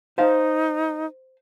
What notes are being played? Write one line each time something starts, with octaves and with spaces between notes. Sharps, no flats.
D#4 C5 F5